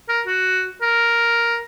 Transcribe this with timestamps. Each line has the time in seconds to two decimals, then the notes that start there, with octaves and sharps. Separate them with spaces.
0.08 A#4
0.27 F#4
0.82 A#4